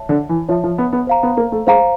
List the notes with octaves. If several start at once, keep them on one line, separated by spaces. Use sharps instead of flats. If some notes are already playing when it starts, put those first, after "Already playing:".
Already playing: C#5 E5 A5
D3
E3
F3 C#5 E5 A5
F3
B3
B3
C5 F5 A#5
B3
A#3
A3
G#3 C5 F5 A#5